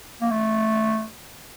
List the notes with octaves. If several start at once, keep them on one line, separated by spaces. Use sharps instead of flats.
A#3
A3